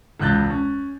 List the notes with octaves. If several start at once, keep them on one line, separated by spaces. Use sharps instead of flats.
E1 C#2 F#6 G6 A6
C#4